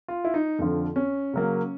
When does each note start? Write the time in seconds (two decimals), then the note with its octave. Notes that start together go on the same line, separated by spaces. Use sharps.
0.08 F4
0.24 E4
0.34 D#4
0.59 F2 D3 F3
0.96 C#4
1.33 C#3 F#3 A#3